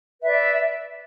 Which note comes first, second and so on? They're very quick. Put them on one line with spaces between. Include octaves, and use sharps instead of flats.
B4 E5 D5